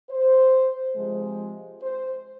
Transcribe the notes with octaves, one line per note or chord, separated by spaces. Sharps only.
C5
C3 F3 G#3
C5